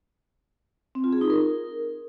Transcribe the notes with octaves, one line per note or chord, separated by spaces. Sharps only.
C4
F4
G#4
D#4
A#4